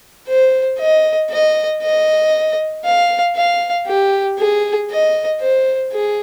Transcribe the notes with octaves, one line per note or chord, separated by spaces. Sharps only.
C5
D#5
D#5
D#5
F5
F5
G4
G#4
D#5
C5
G#4